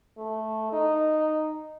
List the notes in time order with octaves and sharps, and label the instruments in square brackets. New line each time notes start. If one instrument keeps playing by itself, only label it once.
[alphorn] A3
D#4